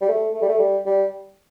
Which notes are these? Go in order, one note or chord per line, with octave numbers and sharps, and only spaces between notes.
G3
A3
A3
G3
A3
G3
G3